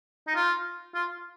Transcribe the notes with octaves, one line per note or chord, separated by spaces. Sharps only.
D#4
F4
F4